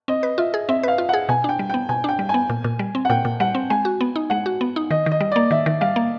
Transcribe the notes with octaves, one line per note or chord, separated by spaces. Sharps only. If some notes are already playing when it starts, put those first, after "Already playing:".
C4 D#5
B4
F4 E5
G#4
C4 E5
B4 F5
F4
G#4 F#5
B2 G#5
D4 G5
G3
B3 G5
B2 G#5
D4 G5
G3
G#5
B3
A#2
A#2
G3
C4
F#5
A#2 G5
A#2
G3 F#5
C4
G#3 G#5
F#4
B3
D#4
G#3 F#5
F#4
B3
D#4
D#3 D#5
D#3
D#5
G3
A#3 D5
D#3 E5
D#3
G3 F5
A#3